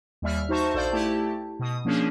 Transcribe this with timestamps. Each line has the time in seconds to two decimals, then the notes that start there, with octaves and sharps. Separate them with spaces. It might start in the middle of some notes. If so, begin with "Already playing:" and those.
0.22 D#2 G3 E5 F6
0.49 D#4 F#4 C5 E5 A5 C#6
0.74 A#1 A4 C5 D5 F5 G6
0.92 A3 E4 G4 A5
1.59 B2 D#6
1.85 F3 A#3 C#4 D4 G#4